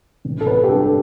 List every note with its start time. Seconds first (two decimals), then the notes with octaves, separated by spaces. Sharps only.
0.25 A1
0.41 A4
0.47 B4
0.64 G4
0.68 G2 A4